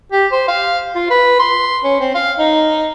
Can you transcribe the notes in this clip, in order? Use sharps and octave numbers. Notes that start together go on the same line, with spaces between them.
G4
C5
F5
F4
B4
C6
C#4
C4
F5
D#4